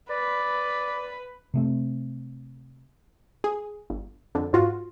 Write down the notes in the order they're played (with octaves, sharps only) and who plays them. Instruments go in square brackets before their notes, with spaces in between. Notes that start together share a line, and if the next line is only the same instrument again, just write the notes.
[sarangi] B4 [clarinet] D5
[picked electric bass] C3 A3 C4
[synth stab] G#4
G1
F2 D3
G#2 F4 F#4